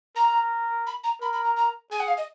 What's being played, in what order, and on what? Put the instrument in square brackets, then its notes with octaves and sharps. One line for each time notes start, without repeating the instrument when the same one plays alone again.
[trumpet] A#4 [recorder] A#5
[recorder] B5
A#5
[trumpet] A#4 [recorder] B5
[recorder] B5
A#5
A#5
[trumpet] G#4 [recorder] G#5
[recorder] F#5
F5
D#5